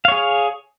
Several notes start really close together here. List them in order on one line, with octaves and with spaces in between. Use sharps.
F5 C#5 G#4